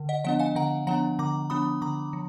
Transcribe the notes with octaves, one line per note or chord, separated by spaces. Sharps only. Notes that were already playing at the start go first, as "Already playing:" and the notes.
Already playing: D3
D#5 F#5
F3 B3 D4 D#5 F#5
F5 G#5
D3 F#5 A#5
F3 B3 D4 F#5 A#5
D3 A#5 D6
F3 B3 D4 B5 D#6
D3 A#5 D6
F3